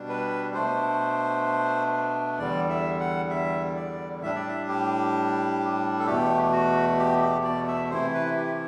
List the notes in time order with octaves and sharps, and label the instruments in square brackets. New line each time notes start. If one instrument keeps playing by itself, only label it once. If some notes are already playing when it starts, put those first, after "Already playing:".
Already playing: [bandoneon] B2 G3 D4
B4
B2 A3 D4 C5
E2 D3 G3 D5
E5
F#5
E5
D5
A2 G3 D4 E5
D5
E5
G4
A4
E2 B2 A3 G4
F#4
G4
G4
D5
E5
C3 E3 A3 E4 C5
B4
G4